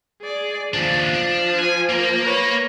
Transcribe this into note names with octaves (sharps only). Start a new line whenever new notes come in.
G#4 D5
D#2 F3 D4
D4
G#5
A#3 A#4
B4 C#5